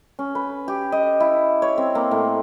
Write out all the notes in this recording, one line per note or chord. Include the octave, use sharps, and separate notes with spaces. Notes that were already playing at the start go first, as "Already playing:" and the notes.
C#4
B4
G4
D#5
E4
C#5
C4
A#3
A2